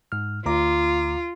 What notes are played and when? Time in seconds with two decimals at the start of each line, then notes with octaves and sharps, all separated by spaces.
0.12 G#2 F6
0.46 D2 F4 A#5 D6